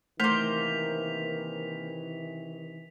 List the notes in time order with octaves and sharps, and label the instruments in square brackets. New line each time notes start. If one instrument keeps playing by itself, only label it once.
[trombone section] C3 D#3 E3 [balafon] A3 [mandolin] A#3 C5 [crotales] B6 F7